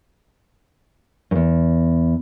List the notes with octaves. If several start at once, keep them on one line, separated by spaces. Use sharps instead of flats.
E2 G2